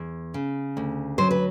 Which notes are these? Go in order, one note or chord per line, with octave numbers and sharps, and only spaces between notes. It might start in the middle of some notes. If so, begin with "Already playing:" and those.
Already playing: E2
C#3
D2
F#3 C5
B4